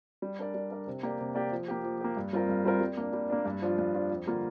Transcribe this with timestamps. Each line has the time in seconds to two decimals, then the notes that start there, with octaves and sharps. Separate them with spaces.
0.22 G3
0.39 D4 A#4 D5
0.54 G3
0.71 D4 A#4 D5
0.87 C3
1.03 A#3 G4 D5
1.19 C3
1.35 A#3 G4 D5
1.52 F3
1.68 A#3 G4
1.84 F3
2.00 A#3 G4
2.17 G2
2.33 G3 C4 F4 A#4
2.49 G2
2.65 G3 C4 F4 A#4
2.80 G3
2.97 A#3 D4
3.13 G3
3.30 A#3 D4
3.45 G2
3.62 F3 D4 F4
3.78 G2
3.94 F3 D4 F4
4.11 F2
4.27 D3 G3 A#3 F4